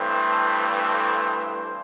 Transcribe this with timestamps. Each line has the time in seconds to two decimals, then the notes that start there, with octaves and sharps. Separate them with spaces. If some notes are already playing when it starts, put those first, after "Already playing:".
Already playing: G2 E3 A3 C4 C5
0.79 C5